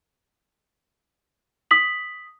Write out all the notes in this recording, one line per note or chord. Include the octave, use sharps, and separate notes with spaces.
D#6 B6 F#7